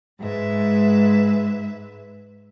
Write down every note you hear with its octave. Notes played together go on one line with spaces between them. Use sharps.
G#2 G#3 B4 E5